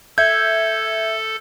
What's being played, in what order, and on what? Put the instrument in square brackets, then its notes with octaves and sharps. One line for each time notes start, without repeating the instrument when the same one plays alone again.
[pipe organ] A4 [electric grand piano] E5 G6 [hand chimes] G#6